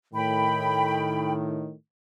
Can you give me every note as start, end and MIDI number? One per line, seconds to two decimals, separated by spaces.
0.14 1.73 45
0.14 1.73 51
0.14 1.32 79
0.14 1.32 83